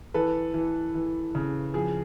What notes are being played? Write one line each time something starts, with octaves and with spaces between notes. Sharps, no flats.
E3 A4 B4
E3
E3
C#3
F3 G#4